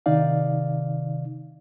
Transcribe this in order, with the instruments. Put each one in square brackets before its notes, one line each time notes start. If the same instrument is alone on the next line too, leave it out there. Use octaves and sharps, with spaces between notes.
[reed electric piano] C3 D#3 D#4 D5 F5